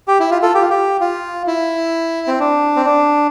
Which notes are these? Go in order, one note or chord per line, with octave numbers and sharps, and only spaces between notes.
G4
E4
F4
F4 A4
G4
F4
G4
F4
E4
C4
D4
C4
D4